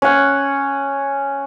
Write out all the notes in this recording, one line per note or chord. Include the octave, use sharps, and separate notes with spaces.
C#4 F#5